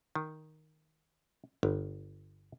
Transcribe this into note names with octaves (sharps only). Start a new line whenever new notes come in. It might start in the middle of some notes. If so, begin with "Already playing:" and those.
D#3
G1